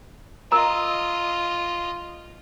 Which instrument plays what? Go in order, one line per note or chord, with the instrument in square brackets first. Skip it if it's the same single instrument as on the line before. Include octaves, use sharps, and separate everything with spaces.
[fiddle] F4 D#5 [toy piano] A#4 A#5